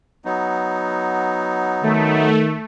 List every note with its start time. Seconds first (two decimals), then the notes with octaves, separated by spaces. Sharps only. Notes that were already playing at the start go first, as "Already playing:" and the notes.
0.25 F#3 B3 D#4
1.83 D#3 A3